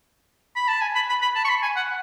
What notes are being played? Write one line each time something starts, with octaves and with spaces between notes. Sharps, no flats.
B5
A5
G#5
B5
B5
B5
A5
C#6
B5
G#5
F#5